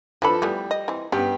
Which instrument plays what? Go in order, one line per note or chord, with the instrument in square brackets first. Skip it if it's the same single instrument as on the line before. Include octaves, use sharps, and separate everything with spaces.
[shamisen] E3 D4 B5 [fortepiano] F3 A4 B4
[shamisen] E3 A3 B3 [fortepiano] G3
[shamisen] D#5
E3 C4
[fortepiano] G2 B3 G4 [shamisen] C#4